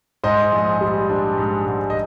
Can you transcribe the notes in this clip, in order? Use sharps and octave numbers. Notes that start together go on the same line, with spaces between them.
G#2 C5 D#5
A#1
G3
D4
G#2
G#2
D#5